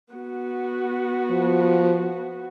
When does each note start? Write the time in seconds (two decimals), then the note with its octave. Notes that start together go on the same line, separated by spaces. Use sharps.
0.14 B3 F#4
1.30 F3